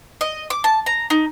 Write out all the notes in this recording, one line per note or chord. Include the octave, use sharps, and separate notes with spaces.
D#5
D6
A5
A#5
D#4